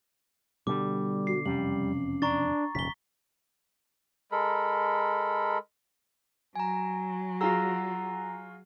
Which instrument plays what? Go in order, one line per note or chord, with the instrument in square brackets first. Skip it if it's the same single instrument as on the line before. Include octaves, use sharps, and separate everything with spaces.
[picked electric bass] B2 D3 [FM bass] G3 [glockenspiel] D6
[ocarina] F#4 [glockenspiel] C7
[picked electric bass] E1 F2 C3 [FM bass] G3 [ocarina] C#4 [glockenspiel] F#7
[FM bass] D4 [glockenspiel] A#5 C#6 A6
[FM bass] D#1 [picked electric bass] B1 F#2 C#3 [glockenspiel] B6 G7
[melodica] G#3 A4 A#4 B5
[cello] F#3 [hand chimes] G#5 A#5
[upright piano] F4 F#4 G#4 [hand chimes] F#5 E6 [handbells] A#5 A#6